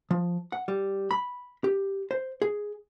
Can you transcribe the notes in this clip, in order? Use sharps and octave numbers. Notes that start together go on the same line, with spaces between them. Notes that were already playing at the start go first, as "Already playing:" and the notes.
F3
F#5
G3
B5
G4
C5
G#4